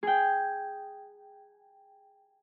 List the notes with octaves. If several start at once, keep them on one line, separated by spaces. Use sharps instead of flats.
G#4 G5